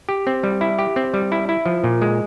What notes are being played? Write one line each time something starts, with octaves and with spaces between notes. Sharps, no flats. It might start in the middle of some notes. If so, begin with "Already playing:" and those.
G4
C4
G3
E4
G4
C4
G3
E4
E4
F3
A#2
G#3